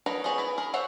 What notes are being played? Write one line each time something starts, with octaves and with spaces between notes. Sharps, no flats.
F#3 D#4 A#4 B4 D#5
B3 G#4 C5 C#5 D#5
E4 B4
G#4 A#4
C5 C#5 E5 F#5